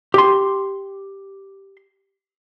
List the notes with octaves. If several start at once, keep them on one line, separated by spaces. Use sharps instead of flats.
G4 C6